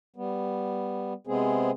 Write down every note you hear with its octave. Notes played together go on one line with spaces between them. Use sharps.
G3 B3
C3 G#3 B3 C4 G#4